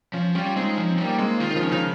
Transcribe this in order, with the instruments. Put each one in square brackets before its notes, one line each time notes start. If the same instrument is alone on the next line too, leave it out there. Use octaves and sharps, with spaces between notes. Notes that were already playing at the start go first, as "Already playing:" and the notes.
[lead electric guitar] F3 [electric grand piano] C#4 F4
[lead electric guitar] G3 [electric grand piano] C#4 F4
[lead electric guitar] G#3 [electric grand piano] C4 D#4
[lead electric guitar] F3 [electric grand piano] C#4
[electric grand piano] C4
[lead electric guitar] G3
[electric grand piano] A#3
[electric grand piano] G#3 C4 [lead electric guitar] A#3
[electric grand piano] D#3 [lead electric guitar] F4
[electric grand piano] D#3
C#3 F3
[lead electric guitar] C#4
[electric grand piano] C#3 F3 [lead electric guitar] D#4